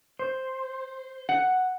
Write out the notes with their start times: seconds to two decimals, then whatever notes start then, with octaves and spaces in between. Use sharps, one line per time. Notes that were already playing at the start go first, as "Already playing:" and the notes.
0.19 C5
1.29 F#5